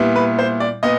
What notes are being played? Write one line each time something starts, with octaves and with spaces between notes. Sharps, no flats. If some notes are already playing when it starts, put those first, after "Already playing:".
Already playing: A#2 G3 B3 E4
B4
C5
D5
A#2 B3 D#5